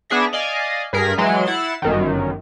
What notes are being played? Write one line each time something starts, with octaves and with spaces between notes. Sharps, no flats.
B3 D4 G#4 E5 A#6
D5 D#5 F5 G#5
G2 G#4 A#4 B6
E3 F#3 G#3 C6 D7
E4 F#5 A6 C7 E7
G1 F#2 D#3